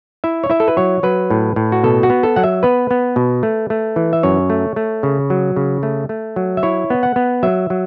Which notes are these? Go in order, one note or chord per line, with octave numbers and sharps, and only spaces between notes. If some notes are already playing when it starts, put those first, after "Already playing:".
E4 E5
C#5
E4 E5
A4
B4
F#3 C#5
F#3 B4
A2
A2
F#4
B2 A4
F#4
B3
A4
F#3 F#5
E5
B3 B4
B3
B2
A3
A3
E3
E5
F#2 C#5
A3
A3
C#3
F#3
C#3
A3
A3
F#3
E5
E4 C#5
B3
F#5
B3
F#3 E5
F#3